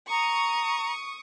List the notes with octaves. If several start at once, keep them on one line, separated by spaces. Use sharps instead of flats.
A#5 C#6 D#6